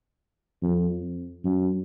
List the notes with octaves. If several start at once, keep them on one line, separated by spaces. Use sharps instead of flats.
F2
F#2